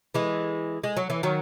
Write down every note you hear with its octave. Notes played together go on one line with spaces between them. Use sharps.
E3 G#3
G#3
F#3
E3
D#3 F#3